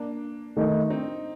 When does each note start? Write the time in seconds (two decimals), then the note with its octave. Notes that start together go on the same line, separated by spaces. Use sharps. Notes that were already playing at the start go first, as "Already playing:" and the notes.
Already playing: A#3 D4
0.56 D#3 A3 D#4
0.90 C4 D#4